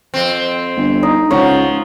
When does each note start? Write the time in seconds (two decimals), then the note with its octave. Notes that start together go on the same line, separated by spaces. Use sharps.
0.14 F2 C4
0.76 G1
1.03 D#4
1.31 C#2 F3 C#5 F#5 A#5